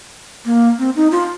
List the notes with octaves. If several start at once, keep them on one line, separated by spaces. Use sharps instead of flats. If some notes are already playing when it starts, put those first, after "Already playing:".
A#3
C4
D#4
F4